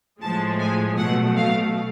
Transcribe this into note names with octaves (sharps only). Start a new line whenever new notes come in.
A2 F3 G#3 A5
G#5
B2 F#3 A3 F#5
F5